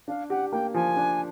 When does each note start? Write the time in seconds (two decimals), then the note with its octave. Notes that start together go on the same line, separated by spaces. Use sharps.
0.08 D4 F5
0.30 G4 F#5
0.52 A#3 G5
0.74 F3 G#5
0.96 D4